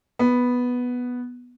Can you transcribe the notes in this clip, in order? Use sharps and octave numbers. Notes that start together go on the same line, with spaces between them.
B3